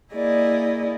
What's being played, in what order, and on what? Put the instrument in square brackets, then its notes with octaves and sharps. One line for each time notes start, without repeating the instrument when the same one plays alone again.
[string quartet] A#3 E4 G#4 D5 D#5